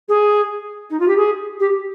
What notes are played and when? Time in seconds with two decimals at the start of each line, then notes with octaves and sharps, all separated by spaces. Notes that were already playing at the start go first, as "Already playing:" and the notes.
0.08 G#4
0.90 D#4
0.99 F4
1.08 G4
1.17 G#4
1.60 G4